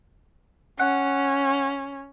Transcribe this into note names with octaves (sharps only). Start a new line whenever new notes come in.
C#4 F#5